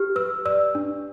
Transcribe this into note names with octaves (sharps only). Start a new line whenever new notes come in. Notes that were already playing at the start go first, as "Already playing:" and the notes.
Already playing: G4 F6
B4 E6
D5 E6
D4